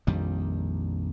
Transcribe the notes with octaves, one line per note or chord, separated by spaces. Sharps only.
A#1 F2 D#3 G3